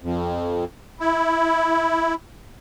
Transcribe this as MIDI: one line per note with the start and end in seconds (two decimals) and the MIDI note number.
0.02 0.65 41
1.00 2.14 64